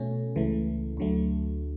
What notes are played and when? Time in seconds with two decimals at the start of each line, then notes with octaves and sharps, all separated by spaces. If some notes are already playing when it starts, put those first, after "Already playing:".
Already playing: B2 A3 C#4
0.36 C#2 C#3 E3 A3
0.97 D2 D3 F#3 A3